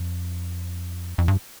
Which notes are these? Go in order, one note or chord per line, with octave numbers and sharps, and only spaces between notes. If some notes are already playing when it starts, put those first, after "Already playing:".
Already playing: F2
F2
G2